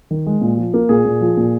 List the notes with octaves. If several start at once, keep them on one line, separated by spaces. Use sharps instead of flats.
D#3
G#3
A#2
F3
A#3
A#2 G#4
A#2
F3
A#2